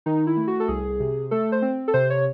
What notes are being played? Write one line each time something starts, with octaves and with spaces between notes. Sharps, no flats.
D#3 D#4
E4
A3
F#4
A4
C2 G#4
C3
A3 A4
C5
C4
A4
C3 C5
C#5